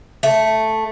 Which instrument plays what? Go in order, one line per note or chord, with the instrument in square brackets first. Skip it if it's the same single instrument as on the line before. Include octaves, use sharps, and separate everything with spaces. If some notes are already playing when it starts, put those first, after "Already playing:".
[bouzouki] A3